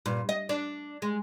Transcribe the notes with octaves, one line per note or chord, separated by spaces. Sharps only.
G2 A#2
D#5
D4
G#3